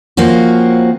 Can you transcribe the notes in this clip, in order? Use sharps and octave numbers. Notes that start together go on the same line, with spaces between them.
F3 A#3 C4 C#4 F#4